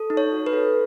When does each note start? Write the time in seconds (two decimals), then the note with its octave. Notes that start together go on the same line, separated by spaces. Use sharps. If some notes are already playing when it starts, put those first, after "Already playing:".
Already playing: A4
0.10 D#4
0.17 C#5
0.32 F#4
0.46 B4
0.53 A4